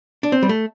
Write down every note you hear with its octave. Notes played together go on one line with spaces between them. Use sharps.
D4
C4
G3
A3